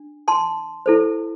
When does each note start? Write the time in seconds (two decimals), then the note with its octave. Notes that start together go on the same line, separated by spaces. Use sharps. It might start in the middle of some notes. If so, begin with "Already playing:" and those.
Already playing: D4
0.28 A5 C6
0.86 E4 A4 C5